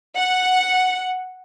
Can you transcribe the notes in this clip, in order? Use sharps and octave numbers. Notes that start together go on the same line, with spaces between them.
F#5